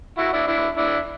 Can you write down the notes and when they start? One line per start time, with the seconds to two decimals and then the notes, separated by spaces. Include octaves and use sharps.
0.18 E4 F#4
0.33 D4 E4
0.47 D4 E4
0.77 D4 E4